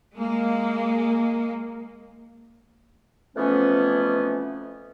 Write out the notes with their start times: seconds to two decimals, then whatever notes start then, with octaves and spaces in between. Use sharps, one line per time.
0.14 G#3 A#3
3.36 F2 E3 F3 A3 B3 C#4